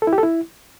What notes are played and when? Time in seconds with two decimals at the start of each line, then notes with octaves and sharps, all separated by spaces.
0.02 A4
0.07 E4
0.13 G4
0.18 A4
0.23 E4